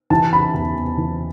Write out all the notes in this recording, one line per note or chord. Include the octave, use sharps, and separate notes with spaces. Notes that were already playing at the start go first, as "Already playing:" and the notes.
E3 A5
C#3 B5
E2 A5
E2
E3